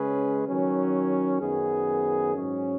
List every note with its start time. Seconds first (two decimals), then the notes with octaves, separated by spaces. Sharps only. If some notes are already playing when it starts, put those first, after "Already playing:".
Already playing: C#3 G#3 C#4 G#4 B4
0.47 D#3 F#3 C#4
1.41 F#2 D#3 B3 G#4
2.35 G#2 F#3 C#4